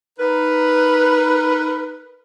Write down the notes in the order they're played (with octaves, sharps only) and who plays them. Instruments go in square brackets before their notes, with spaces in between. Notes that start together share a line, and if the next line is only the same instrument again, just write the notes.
[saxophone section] D#4 A#4 B4